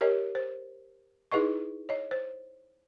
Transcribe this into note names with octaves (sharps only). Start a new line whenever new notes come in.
G4 A#4 C#5 D#5
C5
D#4 E4 G#4 B4 D#5 C#6
C#5 D#5
C5